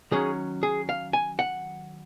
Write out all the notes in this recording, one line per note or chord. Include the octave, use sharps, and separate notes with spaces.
D#3 F#3 C#4 G#4
G#4
F5
G#5
F#5